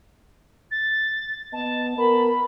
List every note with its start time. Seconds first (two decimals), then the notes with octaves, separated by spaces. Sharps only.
0.71 A6
1.53 B3 D#5 A5
1.98 B3 A#4 B5